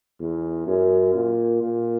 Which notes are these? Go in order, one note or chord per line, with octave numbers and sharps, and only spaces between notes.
E2
F#2
A#2
A#2